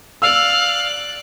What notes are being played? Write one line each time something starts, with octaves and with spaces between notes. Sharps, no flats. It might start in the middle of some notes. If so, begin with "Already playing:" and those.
D5 F5 E6 F#6